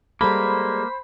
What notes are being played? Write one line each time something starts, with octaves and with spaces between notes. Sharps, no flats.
G3 G#3 A#3 A4 C5 B5